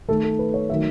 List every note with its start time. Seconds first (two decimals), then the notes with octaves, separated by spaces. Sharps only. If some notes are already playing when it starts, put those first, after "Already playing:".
0.09 D#3 A3 A4
0.23 A4
0.39 B4
0.54 C#5
0.69 D#3 F#3 A3 E5